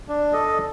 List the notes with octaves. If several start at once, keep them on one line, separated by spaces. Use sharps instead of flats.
D4
A4 D#5